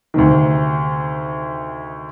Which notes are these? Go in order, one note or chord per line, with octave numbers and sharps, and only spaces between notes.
D2 C3 D#3